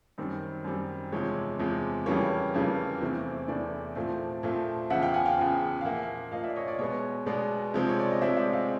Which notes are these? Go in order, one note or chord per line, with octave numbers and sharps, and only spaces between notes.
F#2 D#3 G3 C4
F#2 D#3 G3 C4
E2 C3 F3 G#3 C#5
E2 C3 F3 G#3
F2 C#3 E3 G3 A#3 C#5
F2 C#3 E3 G3 A#3
E2 C3 E3 A3 C4
E2 C3 E3 A3 C4 D5
A#2 F3 A3 C4
A#2 F3 A3 C4
E2 C#3 F3 E5 F#5
F5 G5
F#5 G#5
F5 G5
E2 C#3 F3
F5
A#2 F3 A#3 E5 F#5
A#2 F3 A#3 D#5 F5
D5 E5
C#5 D#5
D5
B2 G#3 B3 C#5
B2 G#3 B3 D5
C3 F3 G#3 C4
C#5
D5
D#5
C3 F3 G#3 C4 D5 E5
D5 E5
D#5 F5